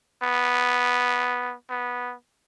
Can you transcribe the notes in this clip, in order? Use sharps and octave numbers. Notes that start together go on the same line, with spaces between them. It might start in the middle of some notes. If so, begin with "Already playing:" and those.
B3
B3